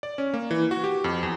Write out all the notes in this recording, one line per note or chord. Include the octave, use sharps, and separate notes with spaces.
D5
C#4
A#3
E3
F#4
G4
F2
E2